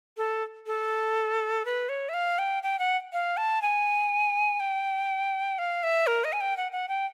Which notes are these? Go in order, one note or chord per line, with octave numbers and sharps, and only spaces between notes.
A4
A4
B4
C#5
E5
F5
G5
G5
F#5
F5
A5
G#5
G5
F5
E5
A#4
D#5
G#5
G5
F#5
F#5
G5